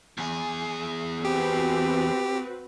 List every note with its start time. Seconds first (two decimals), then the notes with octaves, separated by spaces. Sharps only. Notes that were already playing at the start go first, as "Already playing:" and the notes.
0.18 E2 G#4
1.25 C4 F#4 G4 B4